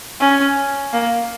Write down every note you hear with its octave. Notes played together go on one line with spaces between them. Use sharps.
C#4
A#3